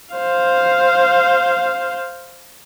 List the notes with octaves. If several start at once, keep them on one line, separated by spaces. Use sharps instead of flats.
C5 F5